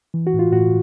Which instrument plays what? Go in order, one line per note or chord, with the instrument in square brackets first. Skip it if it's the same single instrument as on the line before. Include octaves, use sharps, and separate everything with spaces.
[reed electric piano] E3
F#4
A2
F4
A2 F#4